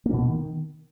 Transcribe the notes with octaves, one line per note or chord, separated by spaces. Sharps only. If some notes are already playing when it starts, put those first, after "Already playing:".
A#3
B2
B3
D#3